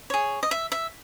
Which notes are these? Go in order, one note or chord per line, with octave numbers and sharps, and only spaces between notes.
G#4 C#5
D#5
E5
E5